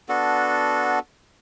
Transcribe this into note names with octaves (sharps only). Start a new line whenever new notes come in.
B3 D4 F#4 A4